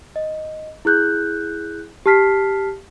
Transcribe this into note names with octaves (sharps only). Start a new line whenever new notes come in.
D#5
E4 G#4 F#6 G6
G4 A5 F6 B6 C7